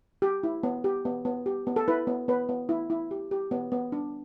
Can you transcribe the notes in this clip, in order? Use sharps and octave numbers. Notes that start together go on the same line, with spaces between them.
G4
E4
B3
G4
B3
B3
G4
B3
A4
E4 B4
B3
B3 B4
B3
E4
E4
G4
G4
B3
B3
D4